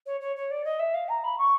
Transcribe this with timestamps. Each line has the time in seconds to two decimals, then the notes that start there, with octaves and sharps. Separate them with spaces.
0.06 C#5
0.20 C#5
0.36 C#5
0.50 D5
0.64 D#5
0.79 E5
0.94 F5
1.08 A#5
1.23 B5
1.38 C#6